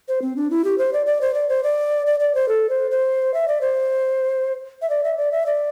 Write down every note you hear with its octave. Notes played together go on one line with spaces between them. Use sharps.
C5
C4
D4
E4
G4
C5
D5
D5
C5
D5
C5
D5
D5
D5
C5
A4
C5
C5
E5
D5
C5
E5
D5
E5
D5
E5
D5